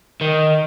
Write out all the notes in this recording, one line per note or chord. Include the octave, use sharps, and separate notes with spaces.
D#3